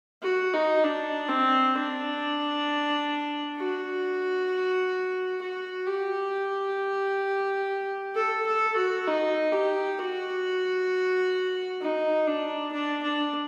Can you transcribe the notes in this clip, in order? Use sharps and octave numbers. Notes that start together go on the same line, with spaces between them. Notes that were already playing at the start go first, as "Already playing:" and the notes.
F#4
D#4
D4
C4
D4
F#4
F#4
G4
A4
A4
F#4
D#4
G4
F#4
D#4
D4
D4
D4